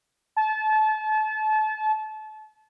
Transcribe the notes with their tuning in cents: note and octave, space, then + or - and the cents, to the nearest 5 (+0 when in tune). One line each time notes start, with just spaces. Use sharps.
A5 -30